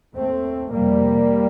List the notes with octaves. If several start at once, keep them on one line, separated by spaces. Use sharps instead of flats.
D#2 A3 C4
F2 C3 G3 A#3